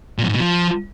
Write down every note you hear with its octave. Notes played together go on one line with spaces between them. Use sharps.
A#2
F2
G#2
B2
F3